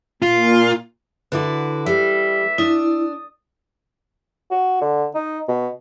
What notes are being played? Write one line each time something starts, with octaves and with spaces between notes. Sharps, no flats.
A#2 F4
D3 E4 F#4 B4 D6
G3 E5
D4 E4 D#6
F#4
D3
D#4
B2